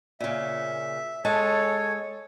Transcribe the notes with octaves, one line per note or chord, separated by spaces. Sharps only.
A#2 C#3 E5
G#3 G#4 A4 C#5 A5